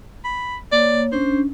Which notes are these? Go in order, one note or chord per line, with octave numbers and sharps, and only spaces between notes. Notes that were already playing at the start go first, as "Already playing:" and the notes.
B5
A#3 C#5 D5
C#4 D4 C5